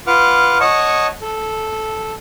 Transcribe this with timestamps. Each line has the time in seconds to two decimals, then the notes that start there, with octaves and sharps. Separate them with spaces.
0.07 F4 B4 F#5 D6 F6
0.60 C#5 D#5 F#5 A5 C#6
1.22 A4